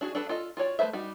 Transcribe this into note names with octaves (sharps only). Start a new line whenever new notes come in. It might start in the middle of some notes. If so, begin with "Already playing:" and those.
D4 F#4 G#4
D4 A4 B4
F4 A4 D#5
F4 F#4 C#5 D5
A3 F4 B4 C5 E5
G3 D#4 F#4